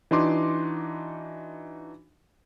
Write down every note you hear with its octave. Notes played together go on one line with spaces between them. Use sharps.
E3 D4 D#4 F#4 C6 D6